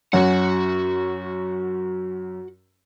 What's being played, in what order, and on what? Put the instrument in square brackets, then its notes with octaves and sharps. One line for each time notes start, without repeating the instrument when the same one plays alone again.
[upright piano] F#2 C#4 [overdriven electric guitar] F#4 F#5